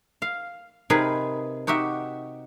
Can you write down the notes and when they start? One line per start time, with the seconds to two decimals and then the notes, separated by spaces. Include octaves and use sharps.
0.22 F5
0.90 C3 D#4 G#4 A#4 B4
1.67 D#4 F#4 G4 E5